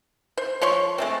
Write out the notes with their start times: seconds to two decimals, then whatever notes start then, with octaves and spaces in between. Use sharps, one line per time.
0.38 C5
0.61 F3 C#5 C6 C#6
0.98 G#3 A3 C4